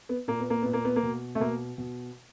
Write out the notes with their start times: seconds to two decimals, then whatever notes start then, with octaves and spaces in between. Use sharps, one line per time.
0.09 B3
0.28 A#2 A#3
0.40 B3
0.50 A#3
0.62 A#2 B3
0.73 A#3
0.85 B3
0.96 A#3
1.03 B2
1.35 A3
1.40 B2 A#3
1.78 B2